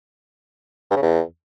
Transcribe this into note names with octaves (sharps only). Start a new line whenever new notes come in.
G2
C#3
E2